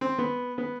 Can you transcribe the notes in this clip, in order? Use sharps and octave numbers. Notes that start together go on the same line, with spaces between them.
C4
B3
B3